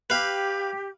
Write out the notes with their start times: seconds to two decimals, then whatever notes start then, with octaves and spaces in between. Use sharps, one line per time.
0.10 G4 B4 F5